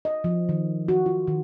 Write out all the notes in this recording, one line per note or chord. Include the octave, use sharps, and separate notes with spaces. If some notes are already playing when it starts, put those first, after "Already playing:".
D#5
F3
D#3
F#4
F4
D#3